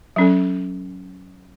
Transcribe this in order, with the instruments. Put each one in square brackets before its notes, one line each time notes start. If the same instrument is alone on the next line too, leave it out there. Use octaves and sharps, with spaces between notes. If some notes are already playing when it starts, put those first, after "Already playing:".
[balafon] F#3 C#4 A4